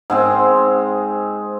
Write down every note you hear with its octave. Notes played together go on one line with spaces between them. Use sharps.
G#2 G#3 C4